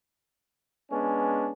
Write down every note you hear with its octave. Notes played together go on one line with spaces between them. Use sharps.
G#3 B3 C#4 D4